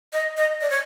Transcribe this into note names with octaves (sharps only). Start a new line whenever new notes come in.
D#5
D#5
D5
C#5